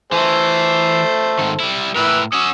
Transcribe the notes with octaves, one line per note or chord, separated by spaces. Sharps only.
E3 A3 A4 C5
G#2 D#3
G3 E4
A2 E4 A#4 B4 E6
C#4 F#4 D#6 E6